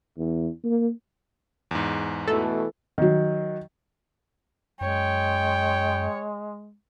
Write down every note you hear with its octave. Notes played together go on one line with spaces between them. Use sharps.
E2
A#3
E2 G#2
B2 E3 A3 A4
D#3 F#3
F#2 G#3 C#5 G5